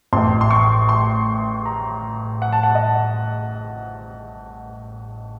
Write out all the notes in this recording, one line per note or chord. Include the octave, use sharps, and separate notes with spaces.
A1 A2 C6
C6
C#6
C6
A#5
F#5
A5
F#5
D#5